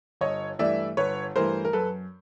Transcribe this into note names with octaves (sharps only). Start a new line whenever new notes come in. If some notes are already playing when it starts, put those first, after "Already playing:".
G1 C#5 D#5
G2 E3 A3 D5 E5
G1 B4 C#5
G2 E3 A3 A#4 C5
A#4
F#2 A4 B4